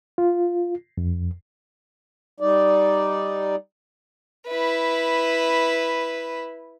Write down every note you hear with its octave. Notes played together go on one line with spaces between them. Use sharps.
F4
F2
G3 D#4 D5
E4 B4